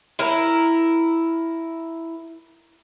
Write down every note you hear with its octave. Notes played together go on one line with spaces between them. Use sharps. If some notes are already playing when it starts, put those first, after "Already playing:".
E4 A#4